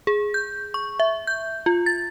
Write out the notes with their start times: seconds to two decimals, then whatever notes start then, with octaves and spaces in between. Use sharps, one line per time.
0.07 G#4
0.34 G6
0.74 C#6
1.00 E5
1.27 G6
1.66 F4
1.86 A6